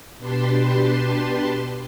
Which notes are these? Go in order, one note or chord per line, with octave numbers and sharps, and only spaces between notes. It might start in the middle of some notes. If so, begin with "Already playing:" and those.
B2 D4 G4 B4 A5 C6